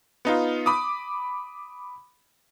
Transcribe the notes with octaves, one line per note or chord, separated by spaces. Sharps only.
B3 D#4 F4
B5 D6 D#6